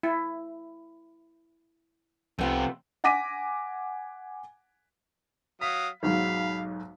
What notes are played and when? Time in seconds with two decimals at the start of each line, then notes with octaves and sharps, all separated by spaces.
0.03 E4
2.39 C2 F2 C3 A3 B3 F4
3.04 F#5 G#5 D6 A#6 B6 D#7
5.61 F#3 F5 D#6 B6
6.03 B1 G#2 F#3 F5 B5